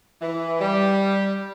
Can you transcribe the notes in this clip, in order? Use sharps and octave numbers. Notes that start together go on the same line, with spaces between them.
E3
G3